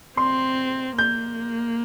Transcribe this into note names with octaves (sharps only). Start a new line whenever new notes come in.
C4 C6
A#3 G6